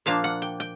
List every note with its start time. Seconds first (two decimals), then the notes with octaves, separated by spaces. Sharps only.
0.06 A#2 F3 A#3 D4 F5
0.24 F#5
0.42 G5
0.60 G5